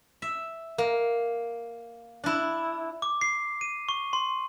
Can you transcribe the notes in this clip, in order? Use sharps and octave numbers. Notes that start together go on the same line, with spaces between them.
E5
A#3
D4 E4
D6
C7
D#7
C#6
C6